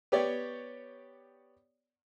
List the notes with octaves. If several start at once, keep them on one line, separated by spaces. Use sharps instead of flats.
B3 G4 C#5 D5